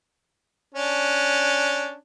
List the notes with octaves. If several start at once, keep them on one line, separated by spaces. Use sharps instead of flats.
C#4 D4